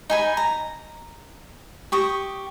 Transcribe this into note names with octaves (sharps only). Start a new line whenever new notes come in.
D#4 G#5 B5
A#5
G4 C#6 D#6